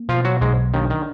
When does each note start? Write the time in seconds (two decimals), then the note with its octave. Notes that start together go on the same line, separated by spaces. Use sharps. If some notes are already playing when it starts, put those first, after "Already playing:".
Already playing: A#3
0.09 B2 F3 F4
0.25 F#3 F#4
0.41 B1 G#2 G#3
0.74 D#2 D#3 D4
0.90 D#3